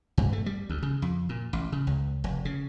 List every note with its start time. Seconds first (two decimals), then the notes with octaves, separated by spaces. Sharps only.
0.18 G2
0.33 A3
0.46 G3
0.70 D2
0.83 C#3
1.02 F2
1.29 A#2
1.53 A1
1.72 C#3
1.87 C#2
2.24 F1
2.45 C#3